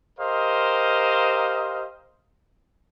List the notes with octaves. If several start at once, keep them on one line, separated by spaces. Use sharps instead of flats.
G4 A#4 C5 D#5 F5